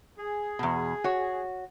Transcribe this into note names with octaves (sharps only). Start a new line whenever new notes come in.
G#4
E2 B2
F#4 C#5